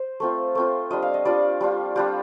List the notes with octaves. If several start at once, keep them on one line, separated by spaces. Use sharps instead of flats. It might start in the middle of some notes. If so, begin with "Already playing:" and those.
Already playing: C5
A3 C4 F4
A3 C4 F4
G3 D4 F4 D#5
F5
D#5
G3 D4 F4 D5
G3 D4 F4
G3 D4 F4 G4